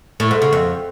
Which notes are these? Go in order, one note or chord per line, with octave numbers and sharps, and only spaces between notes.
A2
G#2
C#3
F2